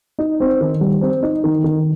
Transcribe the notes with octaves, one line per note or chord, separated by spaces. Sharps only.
D#4
C4
D#3
G3
C4
D#4
D#3
D#3